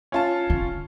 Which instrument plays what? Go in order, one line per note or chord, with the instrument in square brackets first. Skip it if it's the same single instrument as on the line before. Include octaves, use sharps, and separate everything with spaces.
[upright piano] C#4 F4 A5
[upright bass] D3